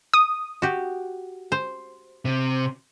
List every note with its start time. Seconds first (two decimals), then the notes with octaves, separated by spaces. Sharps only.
0.14 D#6
0.62 F#4 G4
1.52 C5
2.25 C3